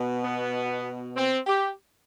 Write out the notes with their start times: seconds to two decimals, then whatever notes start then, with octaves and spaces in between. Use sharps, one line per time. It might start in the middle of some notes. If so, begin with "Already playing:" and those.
Already playing: B2
0.24 B3
1.17 C4
1.47 G4